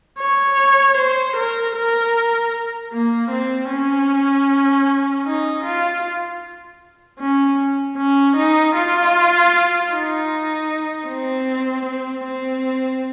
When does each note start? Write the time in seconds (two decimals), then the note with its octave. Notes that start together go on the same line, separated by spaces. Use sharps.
0.20 C#5
0.98 C5
1.36 A#4
1.75 A#4
2.93 A#3
3.31 C4
3.70 C#4
5.25 D#4
5.64 F4
7.19 C#4
7.97 C#4
8.36 D#4
8.75 F4
9.92 D#4
11.08 C4
11.86 C4
12.25 C4